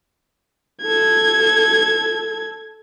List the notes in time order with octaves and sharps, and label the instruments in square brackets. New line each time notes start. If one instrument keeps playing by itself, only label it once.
[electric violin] A4 G#6